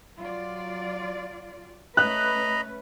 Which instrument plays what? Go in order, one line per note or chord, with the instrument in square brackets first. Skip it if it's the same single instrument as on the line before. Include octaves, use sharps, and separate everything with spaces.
[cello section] F#3 F4 D5
[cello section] A3 C#4 B4 [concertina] D#5 A#5 B5 [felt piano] F#6